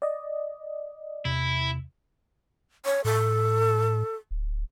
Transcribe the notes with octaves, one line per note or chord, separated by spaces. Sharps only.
D5 D#5
E2 C3 E4
C#5
A2 A4
D1